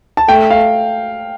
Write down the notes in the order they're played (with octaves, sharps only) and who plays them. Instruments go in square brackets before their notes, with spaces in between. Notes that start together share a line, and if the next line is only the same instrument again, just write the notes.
[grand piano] A5
[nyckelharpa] A3 [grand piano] G5
[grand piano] F5